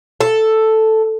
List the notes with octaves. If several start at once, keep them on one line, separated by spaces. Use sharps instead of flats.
A4